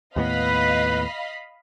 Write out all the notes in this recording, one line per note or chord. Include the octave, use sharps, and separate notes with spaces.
D#2 A2 B3 B4 D#5 F5 B5